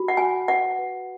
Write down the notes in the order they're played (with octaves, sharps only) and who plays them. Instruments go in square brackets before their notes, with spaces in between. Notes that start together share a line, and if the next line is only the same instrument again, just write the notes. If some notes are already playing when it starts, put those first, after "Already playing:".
Already playing: [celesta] F#4 B5
[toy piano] F#5
[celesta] F#4 [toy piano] G#5
[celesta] B4 [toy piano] F#5
[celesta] B4